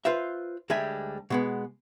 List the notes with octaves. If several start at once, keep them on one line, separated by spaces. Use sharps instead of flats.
F4 B4 C5 E5
D2 G3 G#3 D4 E5 G#5
B2 G#3 B3